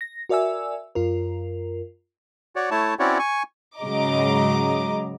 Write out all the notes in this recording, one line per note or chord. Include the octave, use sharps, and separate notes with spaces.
A#6
F#4 A#4 D5 E5 G#5 E6
F#2 F4 A#4
F#4 C#5 D5
A3 E4 C#5 A5
C4 C#4 E4 F#4 C#5 D5
G#5 C#6
G#2 C#3 F#3 D#5 A#5 D6